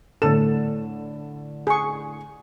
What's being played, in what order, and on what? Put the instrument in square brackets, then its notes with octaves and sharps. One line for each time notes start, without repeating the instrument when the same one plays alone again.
[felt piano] A2 D3 E7 [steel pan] A4
[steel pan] G#4 C#6